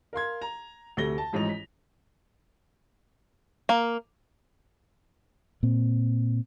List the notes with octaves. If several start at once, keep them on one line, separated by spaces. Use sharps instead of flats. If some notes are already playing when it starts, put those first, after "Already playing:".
A#4 F5 C6 G#6
A#5 F7
D2 C3 A4 A#6 G7
A5
A1 G#2 F3 D#4 F7
B6
A#3
A#2 C4